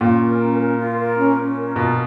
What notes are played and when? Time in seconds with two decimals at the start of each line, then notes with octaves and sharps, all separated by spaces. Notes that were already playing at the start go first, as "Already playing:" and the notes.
0.01 A#2 C#4
0.21 A#4
0.40 C#4
0.59 A#4
0.78 F4
0.98 A#4
1.18 C#4
1.38 C#4
1.56 A#4
1.76 B2 F4